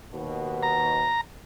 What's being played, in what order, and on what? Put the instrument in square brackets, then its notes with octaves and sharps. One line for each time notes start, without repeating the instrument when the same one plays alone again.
[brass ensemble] D#2 B2
[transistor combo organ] A#5